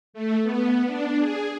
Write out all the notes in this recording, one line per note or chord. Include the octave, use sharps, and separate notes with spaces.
A3
B3
D4
G#4